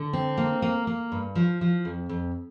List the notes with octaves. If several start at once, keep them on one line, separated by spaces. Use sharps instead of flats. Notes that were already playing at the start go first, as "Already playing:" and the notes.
Already playing: D3
C4
A#3
A#3
A#3
G2
F3
F3
F2
F2